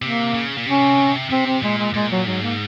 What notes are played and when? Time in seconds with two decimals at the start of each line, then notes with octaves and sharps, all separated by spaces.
0.02 C3 A#3
0.34 C#3
0.58 A#2
0.66 C3 C#4
1.30 C3 C4
1.46 C4
1.63 A#2 G#3
1.78 G#3
1.94 A#2 G#3
2.11 F#3
2.27 G#2 F#3
2.43 A#3